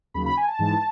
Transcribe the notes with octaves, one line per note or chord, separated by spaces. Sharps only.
D#2 C#3 F#3 B5
B5
G#5
A5
G#2 E3 G#3